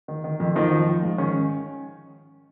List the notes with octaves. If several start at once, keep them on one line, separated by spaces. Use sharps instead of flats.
D#3
D#3
F2
D#3 F3 D#4
F3
F3
G#2
D#3 C#4